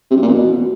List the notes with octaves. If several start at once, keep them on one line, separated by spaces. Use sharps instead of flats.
C3
F#2
A#2
E2
B2